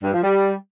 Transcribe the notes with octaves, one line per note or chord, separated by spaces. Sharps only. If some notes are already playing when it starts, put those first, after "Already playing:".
G2
F3
G3